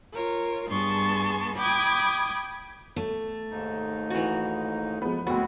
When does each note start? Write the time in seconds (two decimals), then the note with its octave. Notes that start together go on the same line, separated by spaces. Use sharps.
0.12 F4 A#4 C#5
0.68 G2 B3 G#4 A5 C6 C#6
1.56 G5 B5 D6 D#6 G#6
2.96 A3
3.51 D#2 G#2 D#4
4.10 E3 F#4
5.02 F3 G#3 B3
5.27 D2 G#3 B3 C4 F#4